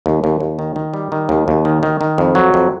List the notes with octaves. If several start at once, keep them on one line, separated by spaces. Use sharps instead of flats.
D#2
D#2
D#2
D#3
D#3
G3
D#3
D#2
D#2
D#3
D#3
D#3
F2
F#3
F2